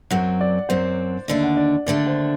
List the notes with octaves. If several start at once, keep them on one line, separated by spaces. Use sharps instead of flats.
F#2 F#3 C4 F#5
D5
F#2 F#3 C4 C5
D#2 D3 A3 D4 D5
F#5
D5
D#2 D3 A3 D4 D5
C5